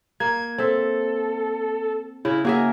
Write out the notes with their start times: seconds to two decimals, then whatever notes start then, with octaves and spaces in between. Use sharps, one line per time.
0.20 A#3 G#6
0.58 C4 A4 E5
2.25 C#3 E4
2.45 A#3 F#4 G#4 E5